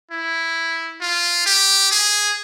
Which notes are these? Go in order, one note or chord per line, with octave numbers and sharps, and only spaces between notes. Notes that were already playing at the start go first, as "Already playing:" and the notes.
E4
F4
G4
G#4